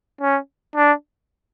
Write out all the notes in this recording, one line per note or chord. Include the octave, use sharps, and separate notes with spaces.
C#4
D4